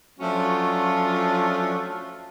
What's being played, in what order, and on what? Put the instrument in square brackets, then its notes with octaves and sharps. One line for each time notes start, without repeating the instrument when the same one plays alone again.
[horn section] F3 F#3 A3 C#4 D4 F4